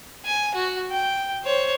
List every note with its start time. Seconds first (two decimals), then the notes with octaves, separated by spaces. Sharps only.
0.25 G#5
0.55 F#4
0.91 G5
1.44 C5 C#5